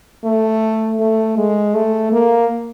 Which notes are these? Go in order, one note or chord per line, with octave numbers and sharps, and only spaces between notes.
A3
A3
G#3
A3
A#3